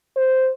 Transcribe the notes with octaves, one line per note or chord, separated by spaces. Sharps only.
C5